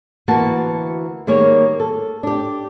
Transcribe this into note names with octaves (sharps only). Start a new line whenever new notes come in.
D2 E3 A#3 F#4 F#5 A5
D#3 G3 A#3 G#4 C#5
A4
D4 G4